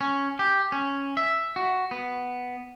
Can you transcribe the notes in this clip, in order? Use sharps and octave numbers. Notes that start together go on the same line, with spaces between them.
C#4
G4
C#4
E5
F#4
B3